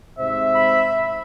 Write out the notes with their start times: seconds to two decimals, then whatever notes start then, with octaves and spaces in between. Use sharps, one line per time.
0.19 G#2 C3 C5 E5
0.55 B5